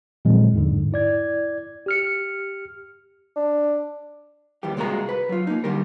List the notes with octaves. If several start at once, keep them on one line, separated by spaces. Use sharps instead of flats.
A#2 D#3 F3 F#3 G#3 C4
E2 G#2 D3
E4 D5 G#6
G4 F6 C#7
D4
D#2 E3 G3 G4
C2 A#2 G#3 A#3 F#4 A#5
B4
F#3 F4
A#3 D#4
D3 G3 G4 A#4